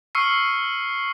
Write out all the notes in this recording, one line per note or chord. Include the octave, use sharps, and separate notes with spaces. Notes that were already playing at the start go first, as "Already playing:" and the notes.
C#6 E6 F6 C7 C#7